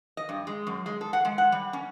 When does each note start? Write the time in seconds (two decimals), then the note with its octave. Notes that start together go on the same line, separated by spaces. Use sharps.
0.17 D#5
0.29 G2
0.47 G#3
0.67 F#2
0.86 G#3
1.01 A4
1.13 F#5
1.25 G#3
1.38 F#5
1.52 G3
1.73 C#4